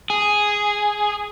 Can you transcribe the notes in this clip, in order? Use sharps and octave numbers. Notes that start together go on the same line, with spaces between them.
G#4